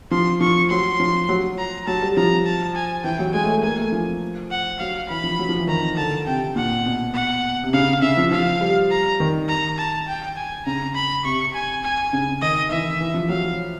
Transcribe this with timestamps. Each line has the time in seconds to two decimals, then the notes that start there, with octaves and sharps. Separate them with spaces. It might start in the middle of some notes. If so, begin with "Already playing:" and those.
0.11 F3 C6
0.41 F3 C#6
0.70 F#3 C6
1.00 F3
1.29 F#3
1.58 A#5
1.87 F#3 A5
2.02 G3
2.17 F3 A#5
2.46 A5
2.75 G#5
3.04 E3 G5
3.19 F#3
3.34 G#3 G#5
3.44 A3
3.54 G#3
3.63 A#3 G#5
3.78 A3
3.92 F3
4.51 F#5
4.80 F#3 F5
5.09 E3 B5
5.24 F3
5.39 F#3
5.49 F3
5.59 E3
5.68 D#3 A#5
5.97 D3 A5
6.26 C3 G5
6.56 A#2 F#5
6.86 B2
7.14 F#5
7.64 C3
7.73 C#3 F5
8.02 C#3 E5
8.17 F3
8.31 F3 F5
8.61 G3
8.91 A#5
9.20 D#3
9.49 A#5
9.78 A5
10.08 G5
10.37 G#5
10.66 C#3 A#5
10.95 B5
11.24 C3 C#6
11.39 C3
11.54 G#5
11.84 G#5
12.13 C#3
12.42 D#3 D#5
12.71 E3 E5
13.01 E3
13.14 F3
13.29 F#3 F5